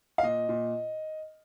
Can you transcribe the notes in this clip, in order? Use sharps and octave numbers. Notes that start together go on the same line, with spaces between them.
F5
A#2 D#5
A#2